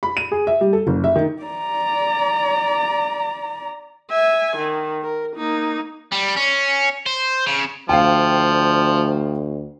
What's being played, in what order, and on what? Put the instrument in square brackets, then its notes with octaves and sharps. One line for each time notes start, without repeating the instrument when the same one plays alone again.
[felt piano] B5
D#7
G#4
E5
G3
A4
F#1
E5
D#3
[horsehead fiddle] D5 A#5
[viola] E5 G#5
D#3
A#4
A#3 D#4
[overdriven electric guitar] G3
C#4
C5
C#3
[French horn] D2 [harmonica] F3 [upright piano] F5 G5